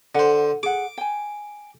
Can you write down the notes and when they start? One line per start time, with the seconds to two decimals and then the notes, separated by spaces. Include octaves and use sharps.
0.15 D3 C5 F#5
0.63 G#4 F#5 D6
0.98 G5 G#5